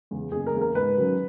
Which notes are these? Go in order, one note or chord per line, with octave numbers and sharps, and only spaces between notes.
E2 C#3
F#1 G#4
A#4
E2 C#3
A#4
G#2 B4
D#3 F#3 C#4